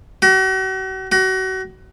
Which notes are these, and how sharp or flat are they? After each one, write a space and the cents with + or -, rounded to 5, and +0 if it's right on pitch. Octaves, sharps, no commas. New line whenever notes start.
F#4 +40
F#4 +30